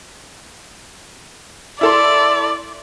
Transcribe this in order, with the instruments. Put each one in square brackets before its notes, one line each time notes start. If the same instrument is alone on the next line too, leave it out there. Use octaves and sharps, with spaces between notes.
[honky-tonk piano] E4 A4 C6 [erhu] D5